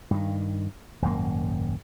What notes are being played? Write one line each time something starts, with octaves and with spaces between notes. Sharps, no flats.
G2 D#3
D#1 G#1 F#2 A#3